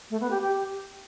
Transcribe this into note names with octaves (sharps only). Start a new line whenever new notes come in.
A3
B3
G4
G4